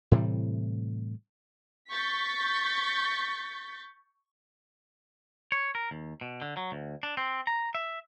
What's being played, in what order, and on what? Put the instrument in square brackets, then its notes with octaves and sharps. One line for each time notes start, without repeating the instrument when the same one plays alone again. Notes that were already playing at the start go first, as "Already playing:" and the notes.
[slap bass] A2 C3 E3 G3
[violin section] C#6 G6 A6 B6
[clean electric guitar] C#5
A#4
D#2
B2
D3
F#3
D2
D4
C4
A#5
E5